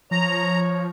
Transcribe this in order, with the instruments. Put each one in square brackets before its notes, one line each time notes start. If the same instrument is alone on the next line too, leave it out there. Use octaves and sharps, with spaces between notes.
[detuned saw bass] F3 [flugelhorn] C#5 [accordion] A#5